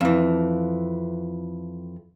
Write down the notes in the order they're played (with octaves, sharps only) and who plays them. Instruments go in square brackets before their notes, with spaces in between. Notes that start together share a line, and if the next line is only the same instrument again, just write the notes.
[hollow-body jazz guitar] F2 E3